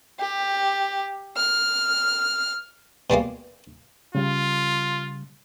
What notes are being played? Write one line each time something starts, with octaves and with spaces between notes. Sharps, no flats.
G4
F6
B2 G3 G#3 A#3
C#3 G3 F4